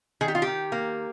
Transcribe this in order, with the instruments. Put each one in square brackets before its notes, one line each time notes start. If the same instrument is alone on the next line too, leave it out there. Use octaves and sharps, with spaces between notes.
[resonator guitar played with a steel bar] D#3 G#4
G4
F4
G4
D#3
A#3